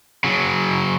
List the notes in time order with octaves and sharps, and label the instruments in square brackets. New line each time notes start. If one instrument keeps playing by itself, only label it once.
[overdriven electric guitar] C#3 F#3